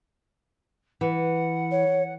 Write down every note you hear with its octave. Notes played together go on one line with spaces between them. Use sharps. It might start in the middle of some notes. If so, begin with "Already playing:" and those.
E3 F#5
C#5